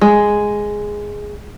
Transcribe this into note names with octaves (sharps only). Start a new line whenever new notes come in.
G#3